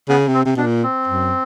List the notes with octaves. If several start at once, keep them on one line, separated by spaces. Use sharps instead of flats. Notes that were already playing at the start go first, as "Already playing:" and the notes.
C#3 B3
C3
C4
C3
B2 D4
A#2
C4
F#2